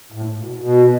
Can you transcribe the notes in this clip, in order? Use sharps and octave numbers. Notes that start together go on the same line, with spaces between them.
A2
B2
B2